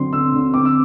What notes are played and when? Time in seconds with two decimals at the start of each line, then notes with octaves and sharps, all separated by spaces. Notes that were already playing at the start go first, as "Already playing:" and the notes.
Already playing: D3 F#3 C4 C6
0.12 D3 E6
0.33 D3
0.54 C4 D6
0.65 E6